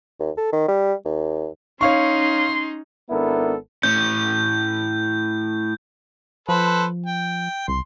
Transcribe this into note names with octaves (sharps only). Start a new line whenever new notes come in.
D#2
A4
D#3
G3
D#2
C#4 D#4 C#5 F5 C6 C#6
G#1 B3 D4 E4 A4 A#4
A2 C#4 G6
F3 A4 B4 C5
G5
C2 C6